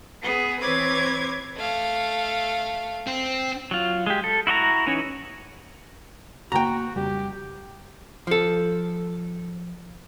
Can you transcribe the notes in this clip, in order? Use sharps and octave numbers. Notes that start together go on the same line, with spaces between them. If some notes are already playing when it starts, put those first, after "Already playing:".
B3 G#4
E3 C4 B4 C#5 D6 G#6
A3 F5
C4
F#3 F4
G#3 G4
A4
E4 F#4 D#5 A#5
E3 C#4 D#4 C#5
F#1 C#3 A#3 F#4 G5 A#5
F2 C#3 G3 G4
F3 A4